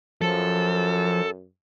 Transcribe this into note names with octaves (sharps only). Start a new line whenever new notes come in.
F#2 F3 A4